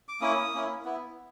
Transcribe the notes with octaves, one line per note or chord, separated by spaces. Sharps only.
D6
A#3 C#4 E4 D#6
A#3 C#4 E4
B3 E4